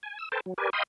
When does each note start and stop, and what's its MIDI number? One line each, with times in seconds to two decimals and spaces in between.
0.03 0.18 80
0.19 0.29 88
0.32 0.40 69
0.32 0.40 71
0.32 0.40 72
0.32 0.40 79
0.32 0.40 81
0.46 0.54 54
0.58 0.70 67
0.58 0.70 70
0.58 0.70 71
0.58 0.70 74
0.58 0.70 80
0.73 0.83 75
0.73 0.83 77
0.73 0.83 79
0.73 0.83 83
0.73 0.83 84
0.73 0.83 87